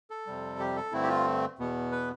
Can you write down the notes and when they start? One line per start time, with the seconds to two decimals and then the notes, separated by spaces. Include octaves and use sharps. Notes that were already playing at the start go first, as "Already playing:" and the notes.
0.10 A4
0.27 F2 C3 G3
0.59 G4
0.76 A4
0.92 G2 D3 A3 C4 E4
1.03 G4
1.09 F4
1.59 E2 B2 B3
1.92 B4